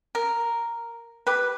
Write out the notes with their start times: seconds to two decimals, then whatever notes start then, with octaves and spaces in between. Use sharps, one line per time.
0.15 A#4
1.27 G4 B4